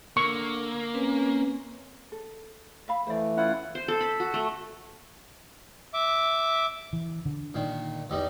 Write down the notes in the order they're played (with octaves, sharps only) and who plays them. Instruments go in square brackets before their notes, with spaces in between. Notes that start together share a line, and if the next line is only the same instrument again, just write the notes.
[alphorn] D3 [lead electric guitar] A#3 [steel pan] C#6 [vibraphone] E6
[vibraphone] C4 B4 [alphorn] C#4
[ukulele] A4
E5 F5 B5
[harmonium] E3 A3 [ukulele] C5 D5
[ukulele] C#4 [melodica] E4 F4 F#5
[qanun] C5
A4
B5
F#4
A3
[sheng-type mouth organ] E5 D6
[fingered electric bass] E3
D3
[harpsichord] A#2 D#3
E2 G3 D#4